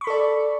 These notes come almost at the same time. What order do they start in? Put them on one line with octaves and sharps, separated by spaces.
C#6 B5 A4 D5